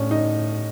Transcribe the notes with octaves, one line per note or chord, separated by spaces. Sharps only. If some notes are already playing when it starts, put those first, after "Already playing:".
Already playing: A2 C#4 D4
D#4